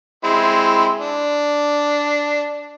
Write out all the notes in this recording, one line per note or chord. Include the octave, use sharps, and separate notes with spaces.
G#3 C4 E4
D4